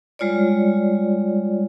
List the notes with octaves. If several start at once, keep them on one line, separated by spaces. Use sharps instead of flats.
G3 G#3 F4 C#5 D5